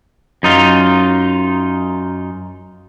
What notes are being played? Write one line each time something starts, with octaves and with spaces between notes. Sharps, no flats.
F#2 D#4 F4